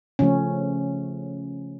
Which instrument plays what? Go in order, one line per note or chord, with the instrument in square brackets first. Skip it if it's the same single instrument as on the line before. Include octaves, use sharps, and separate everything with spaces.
[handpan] C#3 F3 A3 C#4